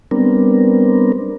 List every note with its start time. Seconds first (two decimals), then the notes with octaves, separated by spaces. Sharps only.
0.11 G3 B3 C4 D4 A#4